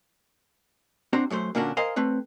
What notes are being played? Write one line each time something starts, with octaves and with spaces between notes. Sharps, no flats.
C4 D4 F#4 C5 A#5
F#2 F#3 A3 C5
A#2 D3 A#3 C#4 D4 F#4
A#4 C5 D#5 F5 G#5
A3 C4 B4 C#5